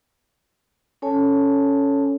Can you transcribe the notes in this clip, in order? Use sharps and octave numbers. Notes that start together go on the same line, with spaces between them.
C#4 A4 C#5 G#5 A5